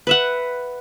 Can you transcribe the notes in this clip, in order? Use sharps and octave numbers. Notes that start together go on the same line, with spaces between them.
B4 E5 F#5